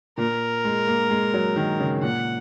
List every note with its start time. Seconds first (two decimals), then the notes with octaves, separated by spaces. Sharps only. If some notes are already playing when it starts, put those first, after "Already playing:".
0.18 A#2 A#4
0.65 G#3
0.87 A#3
1.10 G#3
1.34 F#3
1.56 D#3
1.80 C#3
2.02 A#2 F#5